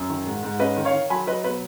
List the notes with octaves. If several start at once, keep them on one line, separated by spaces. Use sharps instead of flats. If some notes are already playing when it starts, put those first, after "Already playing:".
Already playing: F#2
D#3
G#2
G#2
C#4 B4 D#5
D#3
C#5 F5
D#3
F#3 G#5 B5
F#3 B4 D#5
B2 B4